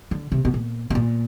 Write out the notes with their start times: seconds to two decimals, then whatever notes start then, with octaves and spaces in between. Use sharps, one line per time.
0.11 D3
0.32 C3
0.45 B2
0.54 A#2
0.90 B2
0.95 A#2